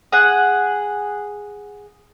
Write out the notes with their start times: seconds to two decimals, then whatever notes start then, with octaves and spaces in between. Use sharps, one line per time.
0.12 G#4 F#5